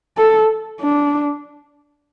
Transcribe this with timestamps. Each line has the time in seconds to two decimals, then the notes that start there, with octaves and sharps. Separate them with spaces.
0.18 A4
0.81 D4